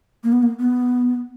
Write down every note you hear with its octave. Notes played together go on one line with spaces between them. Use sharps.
A#3
B3
A#3
B3